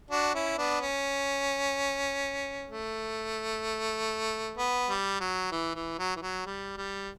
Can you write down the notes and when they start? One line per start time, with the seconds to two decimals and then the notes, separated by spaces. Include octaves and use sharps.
0.11 D4 F#4
0.34 C#4 E4
0.58 B3 D4
0.81 C#4
2.70 A3
4.57 B3
4.89 G3
5.20 F#3
5.51 E3
5.75 E3
5.99 F#3
6.16 E3
6.22 F#3
6.46 G3
6.77 G3